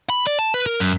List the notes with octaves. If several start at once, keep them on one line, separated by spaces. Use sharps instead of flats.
B5
D5
A5
B4
A#4
F#2